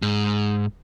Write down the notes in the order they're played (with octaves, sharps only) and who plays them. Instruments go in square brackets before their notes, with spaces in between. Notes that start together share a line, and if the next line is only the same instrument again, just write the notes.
[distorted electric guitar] G#2